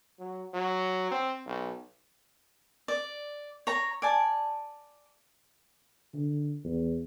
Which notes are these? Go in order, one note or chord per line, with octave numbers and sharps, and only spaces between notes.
F#3
F#3
C4
B1
D5
C#5 A#5
D5 G#5 A5
D3
E2